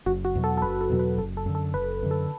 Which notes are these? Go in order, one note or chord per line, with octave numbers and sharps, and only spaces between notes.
F#1 F#4
F#4
E2 B2 F#3
A4
A4
F#1 B4
A4
E2 B2 F#3
B4
F#1 A4
A4
F#2 D3
A4
F#1 B4
F#2 D3
A4